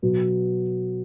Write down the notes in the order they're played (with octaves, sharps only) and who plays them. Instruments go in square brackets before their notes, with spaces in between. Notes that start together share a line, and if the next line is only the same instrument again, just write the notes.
[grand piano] B2 F#3 B3